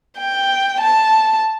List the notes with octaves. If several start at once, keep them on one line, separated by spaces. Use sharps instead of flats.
G5
A5